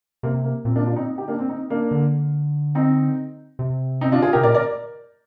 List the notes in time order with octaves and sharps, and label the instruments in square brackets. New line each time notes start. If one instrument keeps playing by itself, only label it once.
[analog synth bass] C3 [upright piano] A#3
[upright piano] A#3
[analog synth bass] A#2 [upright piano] C4
[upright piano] A#3 D4
D4 F4
C4 D#4
D#4 G4
A#3 D4
C4
C4 D#4
A#3 D4
[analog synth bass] D3
[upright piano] C4 D#4
[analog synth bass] C3
[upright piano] C4 D#4
D4 F4
F4 G#4
[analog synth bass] C3 [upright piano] G4 A#4
[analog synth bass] A#2 [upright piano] A#4 D5
[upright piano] A#4 D5